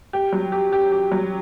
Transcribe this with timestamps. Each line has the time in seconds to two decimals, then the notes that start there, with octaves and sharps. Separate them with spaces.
0.13 G4
0.32 F#3
0.52 G4
0.72 G4
0.92 G4
1.12 F#3